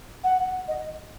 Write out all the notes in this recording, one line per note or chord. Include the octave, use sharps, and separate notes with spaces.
F#5
D#5